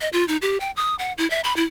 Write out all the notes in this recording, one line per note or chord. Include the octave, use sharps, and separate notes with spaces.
D#5
F4
D#4
G4
G5
D#6
F#5
E4
E5
B5
E4